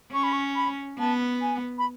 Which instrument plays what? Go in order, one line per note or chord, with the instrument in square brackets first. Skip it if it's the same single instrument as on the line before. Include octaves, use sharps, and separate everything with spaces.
[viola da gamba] C#4 [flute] C#6
[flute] B5
C#6
B5
[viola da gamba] B3 [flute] A5
[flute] G#5
B5